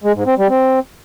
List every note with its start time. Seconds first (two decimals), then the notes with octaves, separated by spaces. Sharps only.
0.04 G#3
0.15 G#2
0.27 C4
0.38 G3
0.49 C4